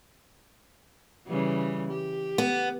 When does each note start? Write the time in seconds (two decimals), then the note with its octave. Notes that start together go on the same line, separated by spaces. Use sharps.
1.27 C#3 E3 G3
1.91 G4
2.38 B3